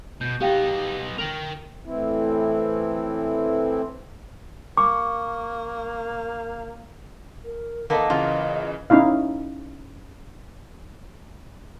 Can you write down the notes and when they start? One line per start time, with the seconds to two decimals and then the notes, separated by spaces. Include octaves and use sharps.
0.21 B2 G6
0.41 B3 D#4 G4 F5 G5
1.18 A#4 G5 F7 F#7
1.85 A2 E3 C4 E4
4.77 A#3 C#6 D6
7.44 A#4
7.90 A#3 B3 D#4 A4 D#5
8.10 C#3 E3 F4
8.90 C#4 D#4 E4 F5